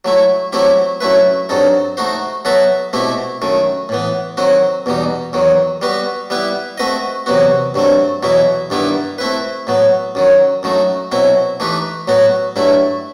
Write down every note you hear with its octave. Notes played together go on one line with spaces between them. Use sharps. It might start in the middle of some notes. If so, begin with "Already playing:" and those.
F#3 A3 E4
F#3 A3 C4 E4 G4
F#2 F#3 A3 E4 B4
G2 F#3 C4 D#4 A4
A3 D#4 F#4 C5
F#3 B3 F#4 A4 E5
B2 A3 C4 E4 G4
F#2 D#3 A3
A2 E3 B3
D#3 F#3 C4 F#4
E2 B2 G3 D#4
E2 D#3 F#3
G3 B3 F#4 B4
G3 B3 E4 B4
A3 C4 F#4 B4 D#5
E2 C3 F#3 B3 F#4
G2 F#3 A3 C4
E2 B2 F#3 B3 E4
G2 D#3 G3 B3 E4
A3 C4 E4 B4
A2 F#3 B3
F#2 D#3 F#3
F#2 F#3 A3 D#4
B2 F#3 C4 E4
E3 A3 D#4 G4 B4
A2 F#3 B3 F#4
G2 F#3 A3 E4